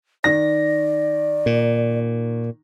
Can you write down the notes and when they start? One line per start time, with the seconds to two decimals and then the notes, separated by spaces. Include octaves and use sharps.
0.24 D#3 D5 A#6
1.46 A#2